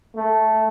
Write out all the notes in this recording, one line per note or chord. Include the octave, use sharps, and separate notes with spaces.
A3